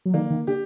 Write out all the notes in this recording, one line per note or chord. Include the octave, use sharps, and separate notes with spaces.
F#3
D#3 A#3
D#3
D3 G4